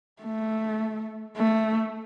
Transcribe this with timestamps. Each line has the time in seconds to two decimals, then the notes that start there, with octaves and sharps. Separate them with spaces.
0.22 A3
1.37 A3